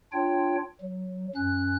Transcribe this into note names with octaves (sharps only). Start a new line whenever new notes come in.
D4 F4 C#5 G5
F#3
F#2 C#4 F#6